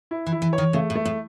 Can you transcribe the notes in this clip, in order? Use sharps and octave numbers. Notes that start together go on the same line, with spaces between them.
E4
E3
E4
E3
C#5
D#3
C#3 A3
A2
A3
A2